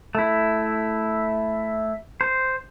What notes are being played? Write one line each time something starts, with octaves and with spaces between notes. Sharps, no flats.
A3 E4
C5